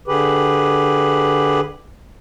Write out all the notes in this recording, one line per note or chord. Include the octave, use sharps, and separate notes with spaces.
D3 G4 G#4 B4